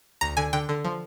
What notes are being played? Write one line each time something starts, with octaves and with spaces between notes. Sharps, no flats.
D2 A#5
D3 G#5
D3 G5
D3
F3